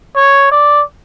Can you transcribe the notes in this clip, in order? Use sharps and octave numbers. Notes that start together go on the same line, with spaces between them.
C#5
D5